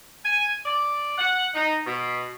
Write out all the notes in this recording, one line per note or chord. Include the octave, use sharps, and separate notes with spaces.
G#5
D5
F#5
D#4
B2